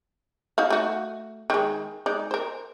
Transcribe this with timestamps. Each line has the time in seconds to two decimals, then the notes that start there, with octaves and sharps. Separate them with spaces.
0.58 D#4 F#4 F5
0.70 A3 F#4
1.50 D#3 G#3
2.06 G#3 D#4 D5
2.31 A#4 C5